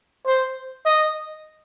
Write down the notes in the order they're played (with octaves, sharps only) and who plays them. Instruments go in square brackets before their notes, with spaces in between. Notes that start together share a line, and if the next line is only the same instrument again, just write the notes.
[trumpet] C5
D#5